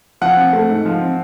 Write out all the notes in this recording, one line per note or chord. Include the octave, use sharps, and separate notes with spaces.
F3 F#5
C4
A3
G#2
F3
C4